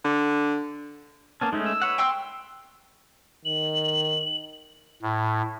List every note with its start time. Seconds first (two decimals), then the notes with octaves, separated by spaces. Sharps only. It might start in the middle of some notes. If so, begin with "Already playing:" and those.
0.04 D3
1.41 A#3 B3 C#4 A5
1.53 G#3 A3 C#4 D#4
1.66 E6
1.82 B4 C#5 F#5
1.98 G5 C6 E6
3.45 D#3 F#7
5.02 A2